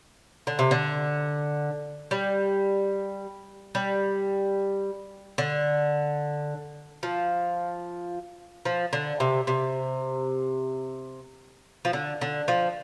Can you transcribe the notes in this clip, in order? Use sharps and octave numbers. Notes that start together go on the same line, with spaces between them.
D3
C3
D3
G3
G3
D3
F3
F3
D3
C3
C3
F3
D3
D3
F3